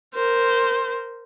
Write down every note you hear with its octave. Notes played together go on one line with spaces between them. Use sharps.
A#4 C5